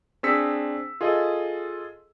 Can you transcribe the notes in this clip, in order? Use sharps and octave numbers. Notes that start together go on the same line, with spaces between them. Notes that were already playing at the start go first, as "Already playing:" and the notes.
C4 D4 G#4 E6 B6 C#7
F4 G#4 A4 D#5